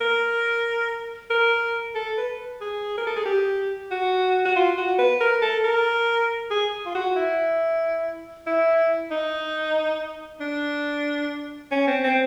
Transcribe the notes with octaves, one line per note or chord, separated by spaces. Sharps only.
A#4
A#4
A4
B4
G#4
A#4
A4
G#4
G4
F#4
F#4
F4
F#4
B4
A#4
A4
A#4
G#4
F4
F#4
E4
E4
D#4
D4
C#4
C4
C4